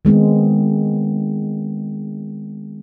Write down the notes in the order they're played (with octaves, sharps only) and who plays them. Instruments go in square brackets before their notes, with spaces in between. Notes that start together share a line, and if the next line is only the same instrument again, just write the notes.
[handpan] D#3 G#3 B3 C4